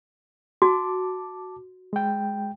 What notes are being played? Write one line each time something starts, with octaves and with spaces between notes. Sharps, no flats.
F#4 A5 D6
G#3 G5